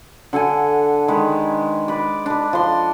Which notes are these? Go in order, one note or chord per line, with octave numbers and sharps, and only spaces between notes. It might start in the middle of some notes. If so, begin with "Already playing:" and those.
D3 A4 F#5 G#5
D#3 G#3 B4 B5
B4 D5
D4 B4
F3 C6